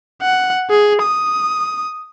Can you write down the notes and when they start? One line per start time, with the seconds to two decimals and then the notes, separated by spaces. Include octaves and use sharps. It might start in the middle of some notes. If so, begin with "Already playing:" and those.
0.22 F#5
0.70 G#4
1.02 D#6